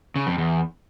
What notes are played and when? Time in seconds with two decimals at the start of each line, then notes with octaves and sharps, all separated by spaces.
0.16 C#3
0.27 F2
0.38 E2